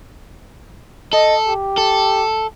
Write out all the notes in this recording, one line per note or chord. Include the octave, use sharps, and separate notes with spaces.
A4 D#5
G4
A4